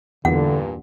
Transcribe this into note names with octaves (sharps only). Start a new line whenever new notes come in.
E2 G2 A#2 D3 F#5